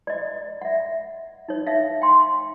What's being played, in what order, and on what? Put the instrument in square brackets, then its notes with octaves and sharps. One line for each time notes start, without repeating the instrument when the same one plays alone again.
[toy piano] D5 D#5
E5 F#5
D#4 C#5
D#4 E5 F5
G5 C6